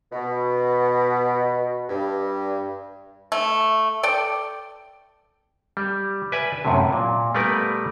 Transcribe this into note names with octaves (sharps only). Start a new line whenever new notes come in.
B2
G2
A3
A4 D5 G5
G3
B4 D5 E5 G#5
F#2 A2 C3
A#2
G3 A3 B3 A#4 B4 D5